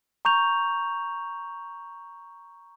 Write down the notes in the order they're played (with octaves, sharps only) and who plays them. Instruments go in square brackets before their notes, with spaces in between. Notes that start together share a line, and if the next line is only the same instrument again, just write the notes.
[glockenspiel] A#5 C#6 G6 F7